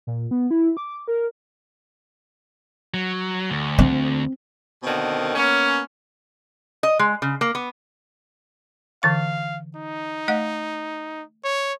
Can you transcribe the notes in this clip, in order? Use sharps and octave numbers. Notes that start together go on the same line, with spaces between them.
A#2
B3
E4
D6
A#4
F#3
D2
C4
B2 D3 D#3 A#3 C4
A#3 B3 C#4
D#5
G#3
C#3
A#3
B3
D3 E3 F5 C#6
D#4
A3 D#5 F#5
C#5